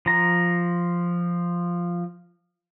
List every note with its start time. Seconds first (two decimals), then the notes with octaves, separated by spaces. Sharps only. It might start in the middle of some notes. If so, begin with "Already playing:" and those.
0.06 F3 A#5